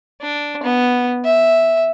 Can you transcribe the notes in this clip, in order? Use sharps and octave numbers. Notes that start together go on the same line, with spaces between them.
D4
B3
E5